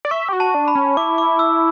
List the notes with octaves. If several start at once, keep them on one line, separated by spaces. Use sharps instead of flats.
D5
E5 C#6
G4
F#4
A5
D4
B5
C#4
E4 D6
D6
E6